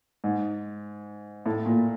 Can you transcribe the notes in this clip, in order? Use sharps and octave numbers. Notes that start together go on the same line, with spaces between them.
G#2
A2
A#2